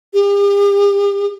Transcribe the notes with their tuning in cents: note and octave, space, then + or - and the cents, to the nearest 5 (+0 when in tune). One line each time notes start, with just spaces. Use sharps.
G4 +45